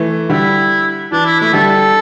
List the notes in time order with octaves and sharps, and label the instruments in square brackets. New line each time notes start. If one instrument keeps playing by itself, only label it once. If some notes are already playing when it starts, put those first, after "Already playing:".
Already playing: [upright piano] E3 A3
[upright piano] D3 G3 [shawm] E4
[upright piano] E3 [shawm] D4
[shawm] E4
[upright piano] A3 [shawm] E4
[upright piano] D3 G3 [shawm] A4